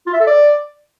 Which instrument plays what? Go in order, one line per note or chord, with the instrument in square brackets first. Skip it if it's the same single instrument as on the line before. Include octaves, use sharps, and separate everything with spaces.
[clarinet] F4
E5
A4
D5